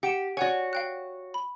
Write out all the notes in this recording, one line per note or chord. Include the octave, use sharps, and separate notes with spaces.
G4 F#5 C#7 E7
F#4 C#5 D5 F#5 G#5
F5 G5 F#6
B5